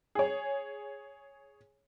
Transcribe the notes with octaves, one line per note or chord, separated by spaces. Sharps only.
G#4 C#5